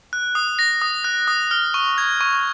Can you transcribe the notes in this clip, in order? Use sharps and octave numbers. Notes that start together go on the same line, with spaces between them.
F#6
D#6
A#6
D#6
F#6
D#6
F6
C#6
G#6
C#6